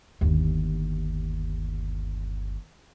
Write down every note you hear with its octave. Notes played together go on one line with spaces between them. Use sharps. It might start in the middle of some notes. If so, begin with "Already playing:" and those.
G1 D#2